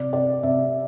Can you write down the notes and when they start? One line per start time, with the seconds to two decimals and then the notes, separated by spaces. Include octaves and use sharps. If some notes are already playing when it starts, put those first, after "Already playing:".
Already playing: C3 D5
0.13 C3 D5
0.43 C3 E5